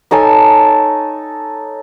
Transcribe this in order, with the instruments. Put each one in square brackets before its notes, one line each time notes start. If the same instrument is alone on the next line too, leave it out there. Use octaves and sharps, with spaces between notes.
[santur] D#4 A4 C#5 G#5